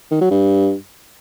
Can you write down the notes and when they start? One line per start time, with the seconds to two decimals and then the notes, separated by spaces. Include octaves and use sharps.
0.11 D#3
0.21 F#3
0.30 G2